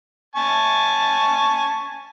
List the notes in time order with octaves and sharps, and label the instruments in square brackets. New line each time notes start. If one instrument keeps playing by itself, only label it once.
[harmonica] G#5 A5 C#6